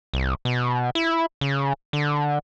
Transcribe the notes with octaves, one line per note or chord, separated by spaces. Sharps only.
C2
B2
E4
C#3
D3